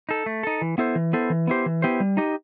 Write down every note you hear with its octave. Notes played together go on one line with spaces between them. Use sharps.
D#4 A4
A3
D#4 A4
E3
B3 E4 A4 C5
E3
B3 E4 A4 C5
E3
B3 E4 G4 C5
E3
B3 E4 G4 C5
G3
D#4 G4 D#5